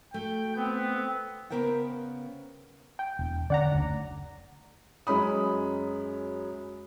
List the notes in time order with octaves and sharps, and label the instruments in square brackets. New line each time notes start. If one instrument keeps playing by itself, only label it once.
[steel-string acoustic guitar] A3 F#4 [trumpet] G5
[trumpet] B3 [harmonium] C4
[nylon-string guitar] C#3 G3 B3 A#4 C5 G5
[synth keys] G5
[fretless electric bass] E1
[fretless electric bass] D3 C#4 [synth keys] D5 F#5 A#5
[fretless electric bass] F#1 D2 D3
[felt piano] F#2 G#3 C#4 B5 D#6